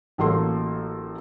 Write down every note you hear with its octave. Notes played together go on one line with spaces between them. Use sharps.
A1 F#3 A#3 A4 C6